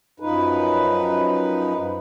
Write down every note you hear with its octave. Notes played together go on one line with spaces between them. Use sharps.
F#2 F3 D#4 B4